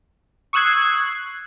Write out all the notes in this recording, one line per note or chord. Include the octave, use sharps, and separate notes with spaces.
C#6 D#6 E6 F#6 G#6 C7